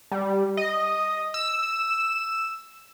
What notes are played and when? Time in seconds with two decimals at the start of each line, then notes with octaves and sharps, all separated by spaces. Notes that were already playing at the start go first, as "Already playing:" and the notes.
0.12 G3
0.57 D#5
1.34 E6